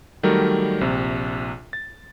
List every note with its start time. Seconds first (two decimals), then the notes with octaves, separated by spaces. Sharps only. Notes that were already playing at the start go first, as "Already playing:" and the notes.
0.23 D#3 F#3 G3 A3 A#4
0.81 A#1 C3
1.73 A6